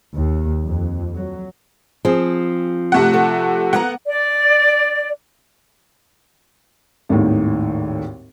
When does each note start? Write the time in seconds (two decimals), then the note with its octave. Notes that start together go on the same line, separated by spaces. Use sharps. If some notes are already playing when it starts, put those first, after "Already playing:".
0.15 D#2
0.65 F2
1.15 F#3
2.05 F3 C4 G#4
2.92 C3 A3 F#5
3.14 A4
3.73 A#3 B3 F#5 A#5
4.06 D5
7.09 G#1 D#2 A2 D#3